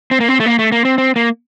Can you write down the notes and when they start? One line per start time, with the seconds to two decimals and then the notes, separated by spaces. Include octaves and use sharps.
0.11 C4
0.20 A#3
0.29 C4
0.40 A3
0.46 A#3
0.59 A3
0.72 A#3
0.85 C4
0.98 C4
1.16 A#3